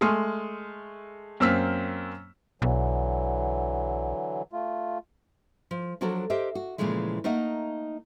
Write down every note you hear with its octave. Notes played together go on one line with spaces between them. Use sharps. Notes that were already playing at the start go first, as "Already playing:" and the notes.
G#3 A3 C6 D#6 F6
F#2 A#3 C4 E6 F6 B6
B1 D3 E3 F#3
A3 F4
F3
F3 F#3 D4 F#4 A4 A#4
G4 A#4 C5 D#5 E5
F#4
A#2 C#3 E3 F3 G#3 A3
A3 A#3 D#4 A#4 D#5 F#5